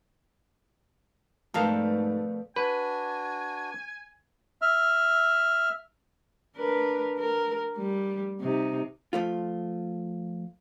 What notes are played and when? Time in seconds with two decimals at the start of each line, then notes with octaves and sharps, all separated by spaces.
1.54 F2 G#2 B2 G3 A3 A4 A#4 F5
2.56 D4 F#4 B4 G#5
4.62 E5 F6
6.56 D4 A#4 B4
7.18 A#4
7.77 G3
8.40 C3 D#4
9.13 F3 A3 F4